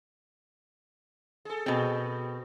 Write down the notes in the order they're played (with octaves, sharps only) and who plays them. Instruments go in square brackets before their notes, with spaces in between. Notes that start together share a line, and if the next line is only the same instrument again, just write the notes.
[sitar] G#4 A4
[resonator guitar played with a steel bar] B2 C4